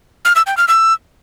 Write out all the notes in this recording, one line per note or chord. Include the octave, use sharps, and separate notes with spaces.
F6
E6
G5
F6
E6